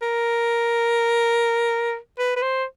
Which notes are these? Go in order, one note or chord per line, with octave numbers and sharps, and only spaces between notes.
A#4
B4
B4
C5